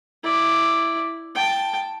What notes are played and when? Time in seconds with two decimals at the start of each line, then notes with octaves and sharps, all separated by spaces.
0.24 E4 D5
1.35 G5 A5